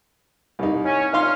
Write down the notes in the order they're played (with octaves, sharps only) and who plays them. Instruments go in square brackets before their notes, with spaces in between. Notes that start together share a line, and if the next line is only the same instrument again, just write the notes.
[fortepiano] C2 D#4
[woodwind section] C#4
[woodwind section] A#2 C#4 F6 [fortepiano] D#4 F5 C6